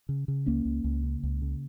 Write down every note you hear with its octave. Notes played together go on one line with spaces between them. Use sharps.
C#3
C#3
C#2 A#3 C#4
C#2
C#2
C#3
C#2
C#3